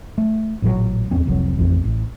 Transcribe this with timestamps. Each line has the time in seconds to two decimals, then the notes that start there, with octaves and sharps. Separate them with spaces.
0.18 A3
0.62 A1 A#2 E3 F#3
1.11 D1 E2 C4 C#4
1.26 F1 C2 C3 F#3
1.57 A1 F2 E3
1.84 A1